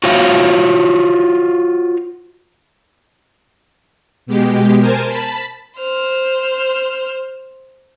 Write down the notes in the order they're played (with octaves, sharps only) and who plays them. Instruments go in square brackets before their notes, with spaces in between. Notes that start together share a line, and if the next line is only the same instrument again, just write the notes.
[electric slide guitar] F4 F#4 C5 C#5 E5 F5
[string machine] B2 G#3 G4
A#4 C5 G#5 A5
A5 B5
[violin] C5 F6